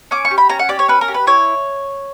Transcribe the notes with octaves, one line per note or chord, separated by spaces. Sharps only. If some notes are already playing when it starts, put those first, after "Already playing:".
C#4 D6
C#6
G4
B5
C#4 A#5
F#5
G4 D5
C#5
C#4 B4
A#4
G4
B4
E4 C#5